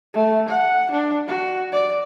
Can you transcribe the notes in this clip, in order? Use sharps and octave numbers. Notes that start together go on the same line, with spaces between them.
A3
F#5
D4
F#4
D5